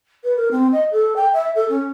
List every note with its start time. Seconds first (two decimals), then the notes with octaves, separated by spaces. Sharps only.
0.23 B4
0.36 A#4
0.51 C4
0.72 D#5
0.91 A4
1.16 G5
1.33 E5
1.55 A4
1.69 C#4